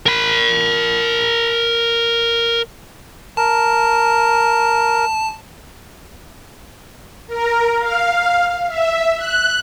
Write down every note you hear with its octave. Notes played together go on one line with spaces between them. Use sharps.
A#4 B5
A#4 A5
A#4
F5
E5
F#6